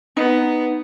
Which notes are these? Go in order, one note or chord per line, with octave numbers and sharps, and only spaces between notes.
B3 D#4